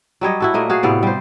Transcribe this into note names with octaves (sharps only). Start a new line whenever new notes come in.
F#3 G3 C#5 D#5
E4 F#4 A4
A#2 A3 A#3 D#5
F#4 G#4 F5
A2 C3 B3 D5
G3 C5